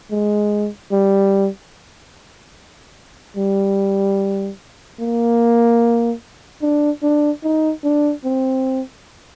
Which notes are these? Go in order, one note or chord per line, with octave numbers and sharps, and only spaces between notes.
G#3
G3
G3
A#3
D4
D4
D#4
D4
C4